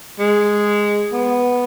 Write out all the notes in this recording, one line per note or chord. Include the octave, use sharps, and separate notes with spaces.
G#3
B3